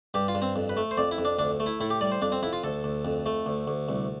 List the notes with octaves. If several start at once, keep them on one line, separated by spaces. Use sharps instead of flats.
G2 G4
F4
G2
C4
F2
B4
A3
C5
F2 D5
E4
F2
D4
D2 D4
A3
E4
A2 E4
G4
G3 D5
C5
F2 D4
C4
F2 E4
F4
D2 A4
D2
F2
A3
D2
D2
C2